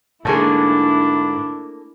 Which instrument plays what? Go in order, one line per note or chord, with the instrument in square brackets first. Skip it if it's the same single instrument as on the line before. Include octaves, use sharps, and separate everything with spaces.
[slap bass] G#2 D3 [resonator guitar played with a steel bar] A3 A#3 G#4 [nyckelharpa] D4 E4